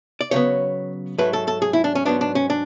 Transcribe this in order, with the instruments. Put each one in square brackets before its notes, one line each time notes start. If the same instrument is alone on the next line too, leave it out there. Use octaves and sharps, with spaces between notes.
[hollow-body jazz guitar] D5
C#3 F#3 B3 C#5
G#2 F#3 A3 B4
A4
A4
G#4
E4
D4
C#4
G#2 F#3 B3 D4
D4
C#4
D4